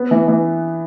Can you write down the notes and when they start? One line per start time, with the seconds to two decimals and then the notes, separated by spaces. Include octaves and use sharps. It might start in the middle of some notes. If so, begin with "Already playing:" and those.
Already playing: B3
0.11 E3
0.28 E3